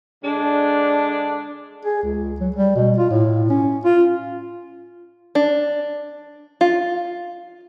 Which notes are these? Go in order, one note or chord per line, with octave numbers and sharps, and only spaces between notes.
D3 G#3 D4
G#4
C#2
F#3
G3
B2
F4
A2
C#4
F4
D4
F4